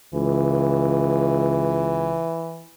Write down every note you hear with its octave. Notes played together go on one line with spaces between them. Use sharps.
C#2 E3